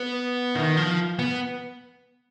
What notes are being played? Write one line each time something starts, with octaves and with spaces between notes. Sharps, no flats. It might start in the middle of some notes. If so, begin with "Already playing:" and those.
Already playing: B3
D#3
F3
B3